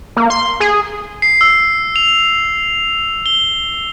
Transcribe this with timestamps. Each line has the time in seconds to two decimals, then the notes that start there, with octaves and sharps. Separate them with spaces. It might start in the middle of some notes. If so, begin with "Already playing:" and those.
0.16 A#3
0.30 C6
0.60 G#4
1.22 C7
1.41 E6
1.96 F7
3.26 G7